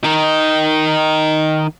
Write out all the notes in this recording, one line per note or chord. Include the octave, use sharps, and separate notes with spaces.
D#3 D#4